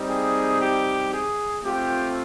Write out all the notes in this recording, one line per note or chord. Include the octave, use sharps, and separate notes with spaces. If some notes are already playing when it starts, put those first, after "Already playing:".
Already playing: G3 C4 D#4
G#4
G4
G#4
A3 C4 F4 G4